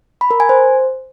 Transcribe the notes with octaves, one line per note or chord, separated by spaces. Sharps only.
B5
A#4
G#5
C5